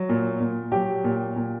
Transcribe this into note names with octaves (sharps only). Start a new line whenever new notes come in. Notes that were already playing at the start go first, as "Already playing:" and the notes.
Already playing: F#3
A#2
A#2
F#3 G4
A#2
A#2